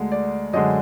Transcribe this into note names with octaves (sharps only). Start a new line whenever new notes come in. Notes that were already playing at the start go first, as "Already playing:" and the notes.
Already playing: D2 D3 G#3
D5
F#2 D3 G#3 D#5